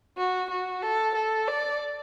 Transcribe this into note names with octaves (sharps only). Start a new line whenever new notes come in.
F#4
F#4
A4
A4
D5